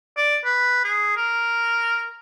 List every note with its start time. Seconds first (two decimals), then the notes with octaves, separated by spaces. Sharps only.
0.17 D5
0.45 B4
0.84 G#4
1.17 A#4